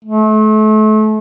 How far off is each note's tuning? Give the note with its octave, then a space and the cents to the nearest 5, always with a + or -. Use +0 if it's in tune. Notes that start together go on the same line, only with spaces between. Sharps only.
A3 -35